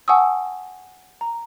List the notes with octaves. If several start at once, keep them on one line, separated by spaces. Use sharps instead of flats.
F#5 G#5 A5 C#6 D#6 E6
A#5